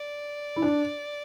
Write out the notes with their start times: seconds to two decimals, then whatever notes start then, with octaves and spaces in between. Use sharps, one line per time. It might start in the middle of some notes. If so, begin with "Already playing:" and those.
Already playing: D5
0.56 E4
0.62 D4